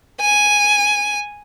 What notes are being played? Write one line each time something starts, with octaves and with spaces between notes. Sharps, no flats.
G#5